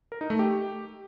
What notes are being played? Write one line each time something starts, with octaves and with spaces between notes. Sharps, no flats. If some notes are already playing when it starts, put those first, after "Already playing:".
A#4
D#4
A3
G4